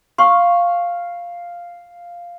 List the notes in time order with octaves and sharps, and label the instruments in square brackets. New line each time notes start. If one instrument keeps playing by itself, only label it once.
[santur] F5 [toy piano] C6 C#6